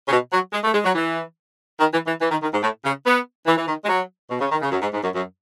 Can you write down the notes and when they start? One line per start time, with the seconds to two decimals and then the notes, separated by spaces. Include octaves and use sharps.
0.07 C#3
0.11 B2
0.32 F#3
0.53 G#3
0.63 A3
0.74 G#3
0.84 F#3
0.95 E3
1.79 D#3
1.93 E3
2.07 E3
2.21 E3
2.31 D#3
2.42 D#3
2.52 G#2
2.62 A2
2.84 C#3
3.05 B3
3.46 E3
3.57 E3
3.67 D#3
3.84 G#3
3.88 F#3
4.30 B2
4.40 C#3
4.51 D#3
4.61 C#3
4.72 F#2
4.82 G#2
4.93 G#2
5.03 F#2
5.14 F#2